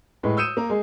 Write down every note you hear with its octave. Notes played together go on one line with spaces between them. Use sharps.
A2 G#3 B4
D#6 E6 G6 C#7 D#7 E7
A#3 A#4
G#3 G#4